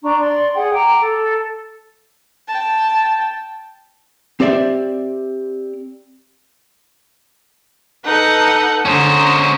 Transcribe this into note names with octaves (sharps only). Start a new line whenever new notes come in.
D4 A#5 C#6
D5 C6
G#4 F#5 G5
G5 A#5 D6
A4
G5 A5
C4 G4 C5 D5 E5
D#4 A4 B4 F#5 G6
D3 C#4 C5 A#5 D#6